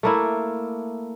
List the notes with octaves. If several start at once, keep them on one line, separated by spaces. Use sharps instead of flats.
A3 A#3 E4